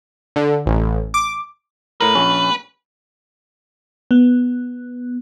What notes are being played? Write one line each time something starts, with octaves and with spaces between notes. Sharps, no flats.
D3
A1
D6
A2 A#4 B4
A#1 C#4
B3